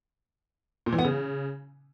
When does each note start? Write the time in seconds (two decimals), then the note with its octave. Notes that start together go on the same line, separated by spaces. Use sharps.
0.86 A#2
0.92 E3
0.98 B3
1.04 C#3